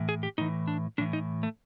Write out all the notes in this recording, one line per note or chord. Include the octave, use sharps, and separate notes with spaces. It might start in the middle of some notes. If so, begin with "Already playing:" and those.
Already playing: A2 E3
G#4
G4
A2 E3 D#4
D4
A2 E3 D4
D#4
A3